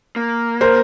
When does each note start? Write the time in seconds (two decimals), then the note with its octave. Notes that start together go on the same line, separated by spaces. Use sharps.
0.16 A#3
0.61 A#4 C5